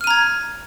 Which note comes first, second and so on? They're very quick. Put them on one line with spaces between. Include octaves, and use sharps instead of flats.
F6 D#7 A#5 G#6